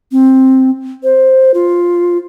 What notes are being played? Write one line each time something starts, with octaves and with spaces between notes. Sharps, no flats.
C4
C5
F4